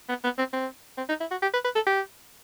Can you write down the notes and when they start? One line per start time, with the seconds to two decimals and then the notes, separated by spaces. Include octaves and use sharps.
0.09 B3
0.24 B3
0.38 C4
0.53 C4
0.98 C4
1.09 D#4
1.20 E4
1.31 F#4
1.42 G4
1.53 B4
1.65 B4
1.75 A4
1.87 G4